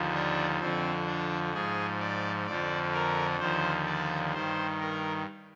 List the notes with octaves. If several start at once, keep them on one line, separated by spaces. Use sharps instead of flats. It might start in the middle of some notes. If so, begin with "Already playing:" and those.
Already playing: D#2 D3 F3
D4
F2 D3 F3 C4
D4
G#2 F3 G#4
D5
F2 D3 F3 D5
A#4
D#2 D3 F3 C5
D5
G2 D#3 C5
A#4